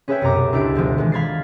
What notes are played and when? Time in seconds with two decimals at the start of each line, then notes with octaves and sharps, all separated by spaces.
0.08 C#4 G#4 B4 C#5 E5 G5
0.21 C2 F#2 B2 A#5 D6
0.53 C#2 D4 E4 G4 D7
0.75 D2 B2 F3 G#3
0.98 D#3 E3 G#3
1.12 F5 B5 G#6 A6 C7